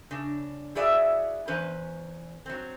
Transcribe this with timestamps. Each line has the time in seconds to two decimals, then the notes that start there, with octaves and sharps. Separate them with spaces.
0.11 C#3 D4
0.75 E4 F#4 G#4 D5 E5
1.48 E2 C#4 B4 C5
2.46 F#3 C4